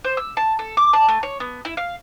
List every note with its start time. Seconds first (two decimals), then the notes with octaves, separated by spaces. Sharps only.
0.05 C5
0.17 E6
0.37 A5
0.59 A4
0.77 D6
0.93 A5
1.09 A3
1.23 C#5
1.40 B3
1.65 E4
1.77 F5